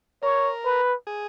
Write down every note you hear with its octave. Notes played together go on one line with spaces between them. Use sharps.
A#4 C#5
B4
G#4